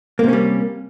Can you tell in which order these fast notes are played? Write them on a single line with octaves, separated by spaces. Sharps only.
A#3 C3 C#4 G3